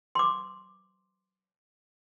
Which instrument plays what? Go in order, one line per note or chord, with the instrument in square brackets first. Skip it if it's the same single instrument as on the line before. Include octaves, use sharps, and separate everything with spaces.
[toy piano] C6 D6